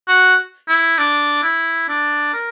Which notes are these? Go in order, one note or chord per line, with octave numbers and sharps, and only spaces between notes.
F#4
E4
D4
E4
D4
A#4